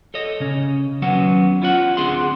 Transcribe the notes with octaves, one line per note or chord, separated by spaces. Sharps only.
A4 C#5 D#5
C#3 C#4
D#2 F#3 B3 C#4 F#5
E4 F4 C#5 F#5
D2 C4 D4 G#4 F#5 C6